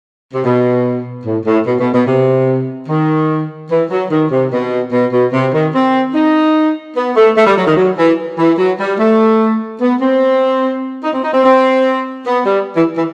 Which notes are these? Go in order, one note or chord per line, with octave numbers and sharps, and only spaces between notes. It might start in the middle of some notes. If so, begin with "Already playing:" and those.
C3
B2
A2
A2
B2
B2
B2
C3
D#3
E3
F#3
D#3
C3
B2
B2
B2
C3
D#3
C4
D#4
B3
A3
A3
G3
F#3
D#3
F#3
E3
E3
F#3
G3
A3
B3
C4
D#4
C4
D#4
C4
C4
B3
G3
E3
E3